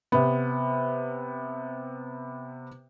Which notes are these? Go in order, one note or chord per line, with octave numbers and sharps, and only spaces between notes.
C3 B3